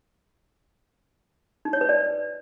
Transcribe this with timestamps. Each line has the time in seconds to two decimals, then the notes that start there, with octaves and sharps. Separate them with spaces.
1.65 D#4
1.73 C#5
1.81 B4
1.89 D5